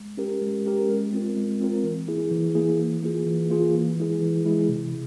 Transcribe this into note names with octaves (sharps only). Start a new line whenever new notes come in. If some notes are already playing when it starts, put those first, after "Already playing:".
Already playing: G#3
C#4 G4 A#4
G#3
C#4 G4 A#4
G#3
C4 F4 A#4
G#3
C4 F4 A#4
E3
A#3 E4 G#4
E3
A#3 E4 G#4
E3
A#3 F4 G#4
E3
A#3 F4 G#4
E3
G#3 E4 G#4
E3
G#3 E4 G#4
C3